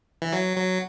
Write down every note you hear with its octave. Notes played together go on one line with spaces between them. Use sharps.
E3
F#3
F#3